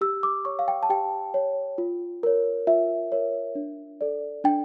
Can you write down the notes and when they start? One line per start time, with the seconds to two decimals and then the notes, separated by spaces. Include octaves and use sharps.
0.01 G4 E6
0.23 D6
0.45 C#5 C#6
0.59 F5
0.68 G5
0.83 A5
0.90 G4 G5
1.34 C#5
1.78 F4
2.23 A#4 C#5
2.67 F4 E5
3.12 A#4 C#5
3.55 D4
4.01 A4 D5
4.44 D4 G5